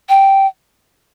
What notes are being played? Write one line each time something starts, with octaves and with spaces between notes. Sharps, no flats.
G5